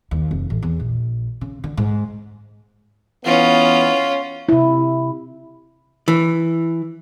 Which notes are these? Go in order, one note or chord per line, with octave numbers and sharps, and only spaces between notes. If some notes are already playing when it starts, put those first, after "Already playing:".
D#2
F1
A1
E2
A#1
C#3
D3
G#2
E3 B3 C#4 F4
C3 E4
E3